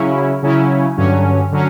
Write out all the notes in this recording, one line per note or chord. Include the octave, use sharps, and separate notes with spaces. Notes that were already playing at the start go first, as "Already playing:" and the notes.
Already playing: C#3 F#3 C#4 E4
C#3 F#3 C#4 E4
G2 D3 F#3 C#4
D3 F#3 C#4